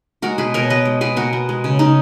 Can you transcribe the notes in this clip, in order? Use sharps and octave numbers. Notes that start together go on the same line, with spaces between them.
G#3 F#4 A#4
B2 G#4 B4
B2 A#4 C#5
B3 B4 D#5
G#3
B2 G#4 B4
B2 F#4 A#4
B3
G#3
C#3
C#3 D#4